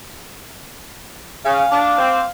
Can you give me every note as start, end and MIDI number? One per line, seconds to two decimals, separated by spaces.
1.45 1.62 49
1.45 2.29 77
1.45 1.69 80
1.71 1.98 62
1.71 2.20 86
1.98 2.20 60